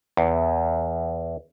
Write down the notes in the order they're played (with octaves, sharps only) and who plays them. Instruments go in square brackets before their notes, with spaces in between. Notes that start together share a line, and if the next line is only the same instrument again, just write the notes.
[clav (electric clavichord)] E2